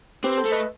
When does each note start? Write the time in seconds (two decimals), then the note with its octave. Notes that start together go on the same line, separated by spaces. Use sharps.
0.24 C4 G4 B4
0.37 A4 C5
0.45 A3
0.52 B4 D#5